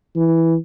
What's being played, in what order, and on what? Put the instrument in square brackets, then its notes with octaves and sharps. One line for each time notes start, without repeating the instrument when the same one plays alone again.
[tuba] E3